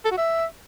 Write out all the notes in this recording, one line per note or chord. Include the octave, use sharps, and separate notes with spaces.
A4
F#4
E5